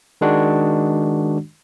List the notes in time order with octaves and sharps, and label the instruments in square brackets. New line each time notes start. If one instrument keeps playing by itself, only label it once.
[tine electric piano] D#3 G#3 D4 F#4